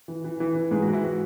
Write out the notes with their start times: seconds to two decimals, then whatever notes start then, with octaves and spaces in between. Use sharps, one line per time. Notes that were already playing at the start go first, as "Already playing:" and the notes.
0.08 E3
0.24 E3
0.40 E3
0.55 E3
0.71 G#2 G#4
0.82 F#4
0.87 E3
0.93 E4
1.04 F#4